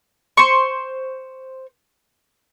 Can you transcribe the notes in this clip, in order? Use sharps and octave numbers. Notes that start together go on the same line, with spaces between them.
C5 C#6